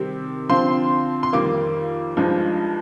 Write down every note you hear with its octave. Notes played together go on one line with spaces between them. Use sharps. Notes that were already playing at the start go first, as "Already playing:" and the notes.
Already playing: C3 D#3 G3 C4
D3 F3 C4 F4 C6
C6
F2 D#3 G3 A#3 F4 D6
G2 F3 G#3 D#4